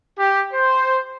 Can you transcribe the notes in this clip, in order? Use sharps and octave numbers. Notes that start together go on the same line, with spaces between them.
G4
C5